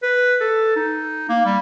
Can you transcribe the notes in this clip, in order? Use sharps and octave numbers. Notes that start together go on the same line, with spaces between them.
B4
A4
D#4
A#3
G3